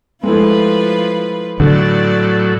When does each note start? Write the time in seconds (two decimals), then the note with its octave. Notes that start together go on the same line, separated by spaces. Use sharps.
0.23 F3 G#3 A3 E4 F4 B4
1.60 A2 D3 F#3 D5